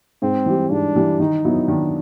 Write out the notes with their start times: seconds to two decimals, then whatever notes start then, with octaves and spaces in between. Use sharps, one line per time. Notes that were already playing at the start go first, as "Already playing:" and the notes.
0.22 G#2 C4
0.46 E3 G3
0.71 G#2 D4
0.95 E3 G3
1.20 D#3 D#4
1.45 F#3 B3 E4
1.68 D#3 D4